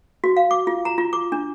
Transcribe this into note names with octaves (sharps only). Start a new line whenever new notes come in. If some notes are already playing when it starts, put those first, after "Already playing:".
F#4
F5
D6
F4
A#5
F4
D6
D4